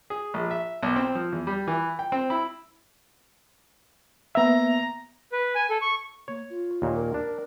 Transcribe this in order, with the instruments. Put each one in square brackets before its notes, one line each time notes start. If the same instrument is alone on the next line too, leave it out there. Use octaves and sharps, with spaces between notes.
[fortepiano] G#4
A#1
E5
B1
C4
F3
E2
G3
E3
G5
C4
E4
[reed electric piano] A#3 B3 E5 [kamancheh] A#5
[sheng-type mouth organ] B4
G#5
A4
C#6
[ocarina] A#3 [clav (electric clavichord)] C#5
[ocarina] F4
[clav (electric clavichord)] D#2 A#2
[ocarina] A#4
[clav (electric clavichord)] D4